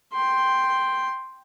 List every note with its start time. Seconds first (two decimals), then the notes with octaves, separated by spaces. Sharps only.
0.13 G5 C6